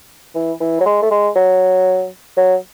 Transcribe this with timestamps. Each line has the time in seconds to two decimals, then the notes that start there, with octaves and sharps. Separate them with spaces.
0.35 E3
0.60 E3
0.80 F#3
0.86 G#3
1.02 A3
1.11 G#3
1.36 F#3
2.37 F#3